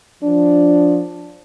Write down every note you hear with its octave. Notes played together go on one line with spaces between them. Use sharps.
F3 D4